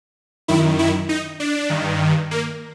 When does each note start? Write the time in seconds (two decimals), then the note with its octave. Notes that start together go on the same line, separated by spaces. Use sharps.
0.48 F#2 D#3 E4
0.79 E4
1.09 D#4
1.40 D4
1.70 G2 D#3
2.31 A#3